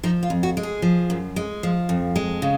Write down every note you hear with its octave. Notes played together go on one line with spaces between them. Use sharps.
F3 D#4
F4
F2
F#4
G#3
G#4
F3
F#2
G#3
F3
F2
G#3
C#3